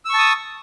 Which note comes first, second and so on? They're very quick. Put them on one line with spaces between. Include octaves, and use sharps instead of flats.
E6 C#6 A5 D#6